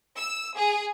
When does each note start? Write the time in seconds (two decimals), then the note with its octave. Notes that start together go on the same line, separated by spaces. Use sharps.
0.17 E6
0.56 G#4